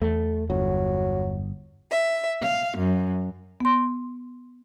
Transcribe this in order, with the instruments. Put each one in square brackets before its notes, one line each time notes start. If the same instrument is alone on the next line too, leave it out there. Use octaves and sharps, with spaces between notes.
[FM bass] E2 [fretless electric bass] A3
[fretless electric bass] G1 [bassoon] F#3
[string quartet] E5
F5
F#2
[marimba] B3 C6